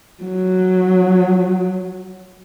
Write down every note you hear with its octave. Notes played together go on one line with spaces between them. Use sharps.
F#3